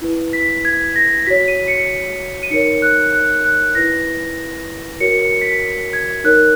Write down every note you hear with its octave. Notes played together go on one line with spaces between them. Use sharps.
E4 B4
B6
G#6
A#6
F#4 C#5 B6
D#7
C#7
D#7
D#4 A#4 C#5 C#7
F#6
F#6
F#6
E4 B4 A#6
F#4 A#4 C#5 C#7
C#7
B6
G#6
D#4 A#4 C#5 F#6